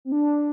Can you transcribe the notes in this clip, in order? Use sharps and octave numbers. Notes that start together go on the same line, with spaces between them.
C4
D4